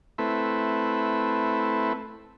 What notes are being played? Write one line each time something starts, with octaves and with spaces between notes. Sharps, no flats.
A3 C4 E4 B4